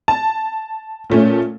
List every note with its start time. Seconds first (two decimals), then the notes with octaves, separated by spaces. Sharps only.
0.08 A5
1.10 A#2 A3 C#4